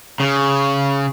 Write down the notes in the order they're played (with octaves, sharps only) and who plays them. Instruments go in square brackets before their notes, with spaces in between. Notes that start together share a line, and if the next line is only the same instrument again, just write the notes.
[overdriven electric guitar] C#3